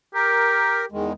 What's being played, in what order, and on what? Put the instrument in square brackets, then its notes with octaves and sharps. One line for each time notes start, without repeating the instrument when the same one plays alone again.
[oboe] G4 [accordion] A#4
[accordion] E2 D#3 G#3